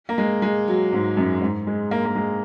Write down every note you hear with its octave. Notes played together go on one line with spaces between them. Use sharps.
A#3
G#3
G#3
F#3
G#2
F#2
G#2
G#3
A#3
A#3
G#3